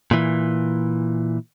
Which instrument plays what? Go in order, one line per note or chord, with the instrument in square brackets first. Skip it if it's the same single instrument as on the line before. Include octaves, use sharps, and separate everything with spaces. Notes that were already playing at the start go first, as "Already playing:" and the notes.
[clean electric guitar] A#2 E3